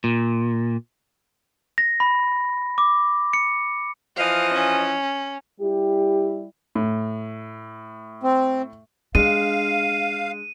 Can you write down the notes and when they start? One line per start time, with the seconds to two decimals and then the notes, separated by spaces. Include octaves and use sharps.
0.04 A#2
1.78 A#6
2.00 B5
2.78 D6
3.33 C#7
4.17 E3 F3 D#5 F5
4.53 C#4
5.61 G3 E4 G4
6.75 A2
8.23 C4
9.15 G#3 D4 F5 D#7